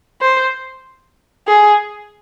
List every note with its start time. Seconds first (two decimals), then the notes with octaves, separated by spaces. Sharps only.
0.21 C5
1.47 G#4